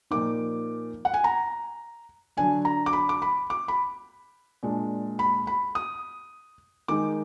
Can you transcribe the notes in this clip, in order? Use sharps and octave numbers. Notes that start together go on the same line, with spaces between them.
A#2 F3 A#3 D#4 D6
F#5
G#5
A#5
D3 F#3 D4 G#5
A#5
D6
B5
D6
B5
D6
B5
A#2 G#3 D4
B5
B5
D#6
D#3 G#3 D#4 D6